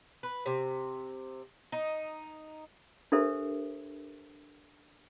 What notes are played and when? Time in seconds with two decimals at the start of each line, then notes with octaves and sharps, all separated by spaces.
0.23 B4
0.46 C3
1.72 D#4
3.12 D4 G4 A4 A#4 C5 E5